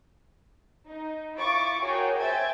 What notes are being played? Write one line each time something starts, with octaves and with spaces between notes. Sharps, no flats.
D#4
E4 F4 C#6 D6 A6
F#4 G#4 A#4 C#5 G5
C5 E5 G5 G#5 G#6 A6